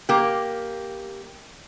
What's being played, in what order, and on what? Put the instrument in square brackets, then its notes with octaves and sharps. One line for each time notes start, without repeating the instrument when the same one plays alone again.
[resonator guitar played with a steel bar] A#3 G4